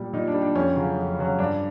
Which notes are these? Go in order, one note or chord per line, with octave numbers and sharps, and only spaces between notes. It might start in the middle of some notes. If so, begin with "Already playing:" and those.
Already playing: A#2 G3
A#2 D#4
D4
G3
D4
F2 C#4
C#3 F#3
F2
C#3 F#3
G2 D4